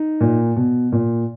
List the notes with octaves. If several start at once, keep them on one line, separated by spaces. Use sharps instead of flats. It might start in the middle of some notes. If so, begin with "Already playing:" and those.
Already playing: D#4
A#2
B2
A#2